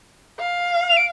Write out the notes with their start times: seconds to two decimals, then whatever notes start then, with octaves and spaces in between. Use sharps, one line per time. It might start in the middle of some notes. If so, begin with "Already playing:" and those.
0.39 F5
0.89 F7
0.97 D7